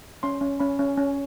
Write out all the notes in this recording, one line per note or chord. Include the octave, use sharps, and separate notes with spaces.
C#4 C6
C#4
C#4 B5
C#4
C#4